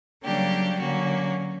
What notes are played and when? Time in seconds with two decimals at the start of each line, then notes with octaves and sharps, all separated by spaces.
0.23 C#3 F#3 G3 A#3 D4 G4
0.79 D3 F#3 A#3 C#4 F#4